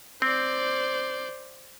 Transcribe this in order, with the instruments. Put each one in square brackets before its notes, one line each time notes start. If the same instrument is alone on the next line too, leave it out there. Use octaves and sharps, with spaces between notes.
[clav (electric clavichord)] C4 [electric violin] C5 D5